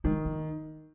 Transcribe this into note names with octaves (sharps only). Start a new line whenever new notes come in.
D#3 G#3
A#3